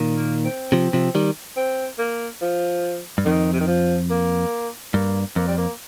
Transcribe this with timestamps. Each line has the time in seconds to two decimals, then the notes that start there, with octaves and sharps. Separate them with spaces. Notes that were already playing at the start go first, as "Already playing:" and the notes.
Already playing: A#2 D#3
0.16 A#3
0.45 C4
0.72 C3 F3
0.93 C3 F3
1.15 D#3 G3
1.57 C4
1.99 A#3
2.42 F3
3.18 G2
3.25 F2 D#3
3.53 C3
3.60 D#3
3.67 F3
4.10 A#3
4.94 G2 A#3
5.36 F2 A#3
5.47 G3
5.58 A#3